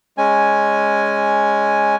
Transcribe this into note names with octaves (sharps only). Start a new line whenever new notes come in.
G#3 C#4 G#5